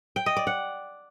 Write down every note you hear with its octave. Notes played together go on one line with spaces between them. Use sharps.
G5
D#5
D5
F#5